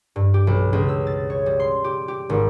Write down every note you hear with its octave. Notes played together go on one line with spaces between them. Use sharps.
G2
G4
B1
C#2
E6
A6
C#5
G3
C6
G4
G4
G#1